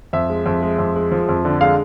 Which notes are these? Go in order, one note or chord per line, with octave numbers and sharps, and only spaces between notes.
F2 E5
G#3
F2
G#3
F2
G#3
F3
F2
D3
G#3 F5